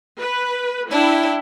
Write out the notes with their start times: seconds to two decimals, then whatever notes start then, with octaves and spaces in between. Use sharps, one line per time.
0.20 B4
0.91 D4 E4 G5